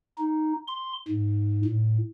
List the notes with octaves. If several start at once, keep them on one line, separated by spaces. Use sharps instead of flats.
D#4
C6
G#2
A2